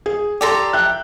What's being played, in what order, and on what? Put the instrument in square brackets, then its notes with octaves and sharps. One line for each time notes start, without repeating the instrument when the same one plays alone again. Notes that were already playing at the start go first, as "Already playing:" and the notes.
[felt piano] G#4
[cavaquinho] G4 A4 A#5 [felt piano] D5 C6
[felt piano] E5 G5 F#6